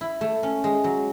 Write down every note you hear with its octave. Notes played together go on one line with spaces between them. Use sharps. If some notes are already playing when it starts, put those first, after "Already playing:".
E4
A3
C#4
G#3
F#3